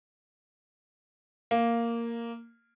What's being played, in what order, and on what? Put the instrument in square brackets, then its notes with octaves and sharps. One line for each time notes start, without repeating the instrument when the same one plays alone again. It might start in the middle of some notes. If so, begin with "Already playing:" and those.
[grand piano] A#3